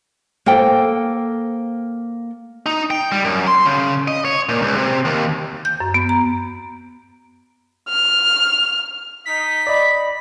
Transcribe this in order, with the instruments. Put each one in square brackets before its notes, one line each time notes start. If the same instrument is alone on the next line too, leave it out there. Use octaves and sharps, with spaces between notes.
[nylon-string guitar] A#3 A4 C5 G5
[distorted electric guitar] D#4
G5
G3
F#2
C6
C#3
D#5
C#5
A#2
C#2
C3
D#2
[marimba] G6
F#2
B3
A#5
[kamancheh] F6
[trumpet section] D#4 D#5 [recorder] B6
[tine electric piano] D5 D#5 [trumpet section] B5